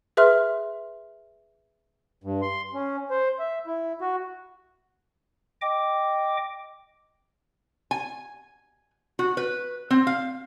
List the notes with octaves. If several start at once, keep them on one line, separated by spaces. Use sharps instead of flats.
G#4 B4 E5 C6 F6
G2
C6
C#4
C5
E5
E4
F#4
D#5 G5 D6
G#5
F#4
B4
C4
F5